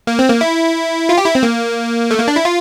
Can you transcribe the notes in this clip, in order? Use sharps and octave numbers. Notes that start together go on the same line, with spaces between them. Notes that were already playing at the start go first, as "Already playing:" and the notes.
A#3
C4
A#3
E4
F4
G4
E4
C4
A#3
A3
A#3
D4
E4
F4